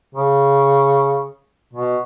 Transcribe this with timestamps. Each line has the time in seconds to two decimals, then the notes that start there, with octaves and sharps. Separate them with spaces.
0.15 C#3
1.73 B2